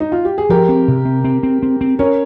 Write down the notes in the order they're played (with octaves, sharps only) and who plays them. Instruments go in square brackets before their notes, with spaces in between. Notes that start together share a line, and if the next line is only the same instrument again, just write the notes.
[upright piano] D#4
F4
G4
G#4
[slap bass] F3 [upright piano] G4 A#4
[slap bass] C4
C3
C4
C4
C4
C4
C4
[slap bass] C#4 [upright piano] A#4 C#5